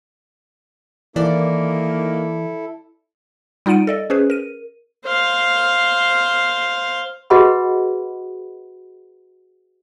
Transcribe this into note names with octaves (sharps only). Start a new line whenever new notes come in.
D#3 E3 A#3 E4 A4 D5
G3 D#4 F4 F#5 D7 D#7
A4 D5 D#5
C#4 G#4 B4 C5
A#4 D#7
C5 F5
F#4 G#4 B4 D#5 F#5 B5